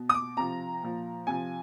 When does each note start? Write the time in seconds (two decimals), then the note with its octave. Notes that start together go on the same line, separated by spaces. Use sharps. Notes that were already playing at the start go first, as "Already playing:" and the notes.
Already playing: B2
0.09 D#6
0.14 D6
0.37 C3 F3 A#5
0.82 A#2 F3
1.27 C3 F3 G#5